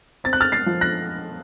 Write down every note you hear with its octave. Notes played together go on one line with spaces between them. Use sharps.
C4 A6
F#6
F6 A6
A6 C7
F3
F#6 A#6